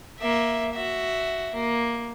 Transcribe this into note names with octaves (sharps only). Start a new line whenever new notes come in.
A#3 E5
F#4 E5
A#3